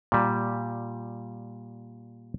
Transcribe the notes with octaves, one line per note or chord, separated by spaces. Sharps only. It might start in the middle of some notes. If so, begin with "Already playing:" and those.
A#2 G3